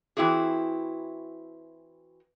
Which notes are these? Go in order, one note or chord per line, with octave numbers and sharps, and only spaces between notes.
E3 F#3 C4 E4 F#4 G#4